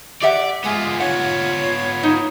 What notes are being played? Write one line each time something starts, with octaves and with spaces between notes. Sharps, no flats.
G4 D5 E5 F#5
G#3 B3 F4
C#5 F#5
D#4